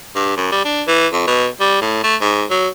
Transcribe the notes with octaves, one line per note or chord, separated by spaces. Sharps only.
G2
F#2
G3
D4
E3
F2
B2
G3
A2
A3
G#2
F#3